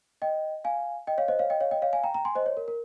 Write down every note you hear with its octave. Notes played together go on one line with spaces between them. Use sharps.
D#5 G5
F5 G#5
D#5 G5
C#5 F5
C5 D#5
C#5 F5
D#5 G5
C#5 F5
D#5 G5
C#5 F5
F5 G#5
G5 A#5
G5 A#5
G#5 C6
C5 D#5
C#5
A#4
A#4